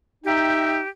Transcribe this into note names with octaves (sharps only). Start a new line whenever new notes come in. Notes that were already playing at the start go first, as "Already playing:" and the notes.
D#4 G4 E5 G5